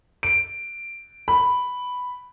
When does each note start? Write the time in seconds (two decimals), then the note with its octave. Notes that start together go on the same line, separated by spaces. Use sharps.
0.23 D7
1.28 B5